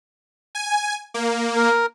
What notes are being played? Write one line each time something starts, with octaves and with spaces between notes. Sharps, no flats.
G#5
A#3
A#4